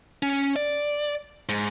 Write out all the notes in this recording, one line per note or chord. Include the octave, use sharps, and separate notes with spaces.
C#4
D5
G#2